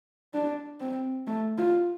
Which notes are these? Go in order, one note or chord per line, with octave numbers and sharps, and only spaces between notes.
D4
C4
A3
F4